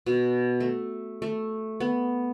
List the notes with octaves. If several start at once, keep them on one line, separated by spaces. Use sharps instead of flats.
B2
A3
A3
B3